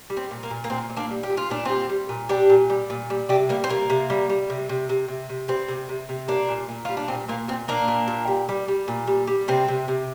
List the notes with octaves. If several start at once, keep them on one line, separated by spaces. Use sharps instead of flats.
G3
C4
A#2
A#3
A#2
A#3
A#2 C4
A#2
A#3 D4
G3
G4
A#2
F4
A#2 D4
G3 C4 F4
G3
A#2
G3 D4 G4
A#2
G3
A#2
G3
C3 D4 G4
G3 A#3
C4
C3 A#3
C3
G3
G3
C3
C3
C3
C3
C3
G3 C4
C3
C3
C3
G3 A#3 D4
A#2
A#2
G3 F4
D4
A#2 C4
A#2 A#3
A#2 C4
A#2 A#3 D4
A#2
A#2
G3
G3
G3
A#2
G3
G3
C3 C4
C3
C3